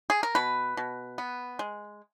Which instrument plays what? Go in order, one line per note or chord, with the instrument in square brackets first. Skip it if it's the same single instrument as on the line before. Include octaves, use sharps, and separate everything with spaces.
[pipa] G#4
A#4
B2 B4
B2
B3
G#3